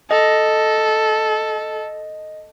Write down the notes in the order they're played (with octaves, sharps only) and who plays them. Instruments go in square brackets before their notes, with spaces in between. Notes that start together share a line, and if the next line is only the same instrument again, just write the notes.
[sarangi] A4 [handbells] D#5